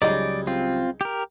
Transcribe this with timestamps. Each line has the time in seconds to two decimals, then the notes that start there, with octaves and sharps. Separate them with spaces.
0.02 C#2 F#3 G3 D#4 G#4 D5
0.47 C4 F4
1.01 G4 A#4